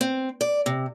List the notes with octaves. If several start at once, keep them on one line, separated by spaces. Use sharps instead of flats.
C4
D5
C3